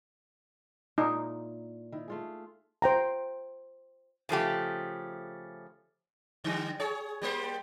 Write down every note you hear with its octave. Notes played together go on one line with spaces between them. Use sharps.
A#2 D#4 E4
D#3 E4
A3 F4 G#4
C5 G5 A#5
C#3 F3 A3 G4
D3 G3
G#4 C#5
G3 A#3 C5